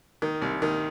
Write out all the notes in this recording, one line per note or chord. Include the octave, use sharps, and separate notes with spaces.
D#3
C2
D#3